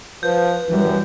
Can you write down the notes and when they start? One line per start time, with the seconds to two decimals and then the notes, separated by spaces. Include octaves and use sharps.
0.23 F3 B4 G6
0.70 F#2 E3 G3